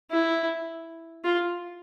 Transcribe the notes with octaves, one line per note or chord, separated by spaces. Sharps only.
E4
F4